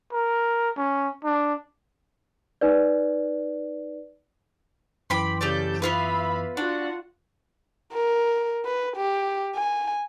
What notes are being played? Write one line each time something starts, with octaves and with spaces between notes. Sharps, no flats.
A#4
C#4
D4
D#4 B4 D5
F#2 E3 G5 B5 C6 D6
C#3 G4 A4 D5 G6
B3 F4 B4 E5 F5 B5
D4 F4 F#4 F#5
A#4
B4
G4
G#5